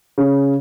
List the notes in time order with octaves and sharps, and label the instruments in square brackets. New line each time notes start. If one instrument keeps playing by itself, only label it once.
[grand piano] C#3